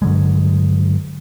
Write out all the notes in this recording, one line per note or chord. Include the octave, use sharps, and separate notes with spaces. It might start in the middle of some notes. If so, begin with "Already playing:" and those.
G2 D3 F#3 G#3